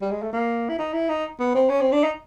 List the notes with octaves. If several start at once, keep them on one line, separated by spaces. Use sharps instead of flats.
G3
G#3
A3
A#3
E4
D#4
E4
D#4
B3
C4
C#4
C4
D4
D#4